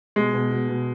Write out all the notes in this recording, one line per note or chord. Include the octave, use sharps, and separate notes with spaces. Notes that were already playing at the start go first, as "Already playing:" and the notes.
B2 G#3
B2
B2
B2